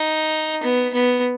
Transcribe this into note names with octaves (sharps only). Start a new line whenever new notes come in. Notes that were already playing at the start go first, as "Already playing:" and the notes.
Already playing: D#4
B3
B3